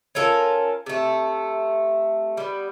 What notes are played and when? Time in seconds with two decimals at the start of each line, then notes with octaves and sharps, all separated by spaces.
0.15 C#4 F4 A4 A#4
0.86 C3 A3
2.37 G3 B3